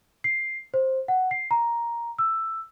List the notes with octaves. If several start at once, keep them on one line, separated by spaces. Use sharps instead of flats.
C7
C5
F#5
C7
A#5
E6